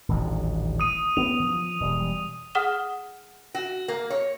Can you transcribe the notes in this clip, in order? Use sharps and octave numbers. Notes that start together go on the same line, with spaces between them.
D#1 A1 D2
D#6 D#7
B3 C#4 F7
F3
E1 G3
G#4 F#5 D#6 F6 E7 G7
F#4
A#3
C#5